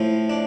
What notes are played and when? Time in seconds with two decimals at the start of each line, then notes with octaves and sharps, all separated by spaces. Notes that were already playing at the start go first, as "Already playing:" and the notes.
Already playing: A2 F3
0.30 D4